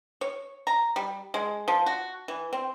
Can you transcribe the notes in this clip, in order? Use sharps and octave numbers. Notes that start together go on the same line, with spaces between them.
C#5
A#5
G3
G#3
F3
F#4
E3
C4